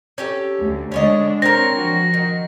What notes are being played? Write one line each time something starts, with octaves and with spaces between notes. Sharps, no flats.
C#4 G4 A4
D2
D3 G#3 C#4 D4 C#5 D#5
C4 D4 A#4 C#5 A#6
F3 F#4
D#3